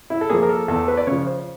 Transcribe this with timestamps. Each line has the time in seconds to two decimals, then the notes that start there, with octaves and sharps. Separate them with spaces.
0.10 E4
0.21 A4
0.30 F3 A#3 G#4
0.43 A#4
0.49 A4
0.68 E2 A4
0.88 B4
0.97 D5
1.07 C#3 F3 C#5
1.27 C5